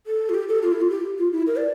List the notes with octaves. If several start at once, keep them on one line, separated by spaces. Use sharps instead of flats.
A4
F4
G4
A4
F4
E4
F4
G4
F4
E4
A#4
D5